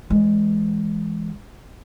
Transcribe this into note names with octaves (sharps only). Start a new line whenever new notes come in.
E3 G#3